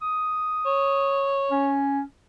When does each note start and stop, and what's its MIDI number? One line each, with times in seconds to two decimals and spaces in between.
0.02 1.36 87
0.66 1.79 73
1.51 2.02 61